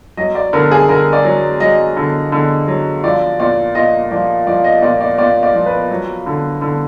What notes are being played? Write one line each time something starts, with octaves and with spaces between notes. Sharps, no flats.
F#3 D#5
D5
D3 A#4
G#4
D3 A#4
D5
F#3
F#3 D#5
D3
D3
F#3
F3 D5
A#2 D5
A#2 D#5
F3 D5
F3 D5
D#5
A#2 D5
D5
A#2 D5
D5
F3
B4
F#3
D3
D3